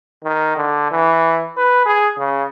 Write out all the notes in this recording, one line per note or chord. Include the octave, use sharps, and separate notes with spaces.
D#3
D3
E3
B4
G#4
C#3